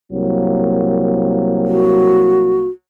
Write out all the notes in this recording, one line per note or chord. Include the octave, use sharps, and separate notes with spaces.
C2 F#3 A#3
F#4